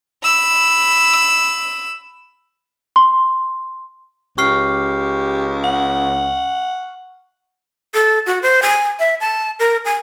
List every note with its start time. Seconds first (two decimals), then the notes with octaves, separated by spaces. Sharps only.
0.24 B5 E6
2.96 C6
4.38 C#2 G4 C#6 F6 C7
5.64 F#5
7.94 A4
8.26 F#4
8.43 C5
8.62 G#5
9.00 E5
9.21 A5
9.60 A#4
9.85 G#5